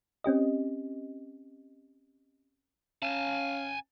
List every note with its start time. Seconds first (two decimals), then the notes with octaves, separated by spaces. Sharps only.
0.24 C4 C#4 G4 D#5
3.02 C#4 F5 G#5 A5